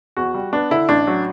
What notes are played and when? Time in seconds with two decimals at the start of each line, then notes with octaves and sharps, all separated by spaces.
0.17 E2 F#4
0.34 G3
0.53 B3 D4
0.71 D3 E4
0.89 A1 D4
1.07 F#3